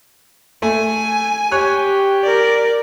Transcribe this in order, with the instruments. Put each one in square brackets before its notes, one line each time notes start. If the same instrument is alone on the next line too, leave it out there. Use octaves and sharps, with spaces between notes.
[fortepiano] A3 [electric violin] G#5
[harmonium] G4 [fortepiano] C#5 F#6
[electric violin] A#4 D5